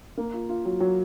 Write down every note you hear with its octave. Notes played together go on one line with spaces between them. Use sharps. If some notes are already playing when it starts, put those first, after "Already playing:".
A#3
F4
F4
F#3
F#3